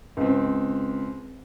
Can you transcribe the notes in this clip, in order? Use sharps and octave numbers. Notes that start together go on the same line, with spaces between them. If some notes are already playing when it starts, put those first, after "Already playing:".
C#2 C4